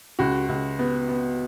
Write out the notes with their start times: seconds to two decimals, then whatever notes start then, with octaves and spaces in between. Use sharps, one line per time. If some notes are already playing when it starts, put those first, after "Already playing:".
0.19 C#2 F#4
0.49 C#2
0.79 B3
1.09 B3